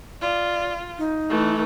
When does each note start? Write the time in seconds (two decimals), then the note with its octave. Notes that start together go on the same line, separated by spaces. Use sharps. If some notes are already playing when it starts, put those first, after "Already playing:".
0.21 F4 D5
0.98 D#4
1.30 E3 A3